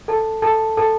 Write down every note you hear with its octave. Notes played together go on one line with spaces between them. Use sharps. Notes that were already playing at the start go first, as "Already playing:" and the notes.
A4 A5
A4 A5
A4 A5